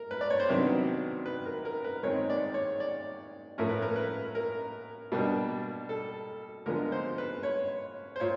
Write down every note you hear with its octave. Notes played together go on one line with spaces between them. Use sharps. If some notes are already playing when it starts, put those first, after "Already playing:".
Already playing: A#4
B4
D5
C#5
C5
C3 D#3 F#3 B3 D4 B4
B4
A#4
A#4
B4
D#3 G#3 C4 C#5
D5
C#5
D5
A2 F3 A3 C#4 A#4
B4
A#4
B4
A#4
B2 G3 A#3 D4
A4
D3 F3 G#3 B3 A#4
C5
B4
C#5
C5
A#2 C#5